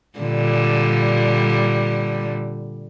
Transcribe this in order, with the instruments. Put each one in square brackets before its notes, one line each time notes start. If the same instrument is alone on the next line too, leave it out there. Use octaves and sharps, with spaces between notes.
[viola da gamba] A#2 D3 G3